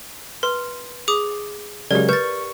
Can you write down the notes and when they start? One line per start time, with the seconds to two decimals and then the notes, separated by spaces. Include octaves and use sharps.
0.43 B4 C6
1.08 G#4 D6 D#6
1.91 C#3 F#3 G#3 G4 A#4 D5
2.09 B4 C#6 G6 A6